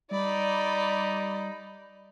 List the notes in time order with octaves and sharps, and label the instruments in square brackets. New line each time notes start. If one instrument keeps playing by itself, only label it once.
[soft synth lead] G3 [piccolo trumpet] D#4 [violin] D5 B5